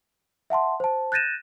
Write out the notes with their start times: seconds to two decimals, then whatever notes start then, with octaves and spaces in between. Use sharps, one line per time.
0.50 E5 F#5 A5 C6
0.80 C5 A5
1.12 F#6 G6 A6 A#6 D#7 E7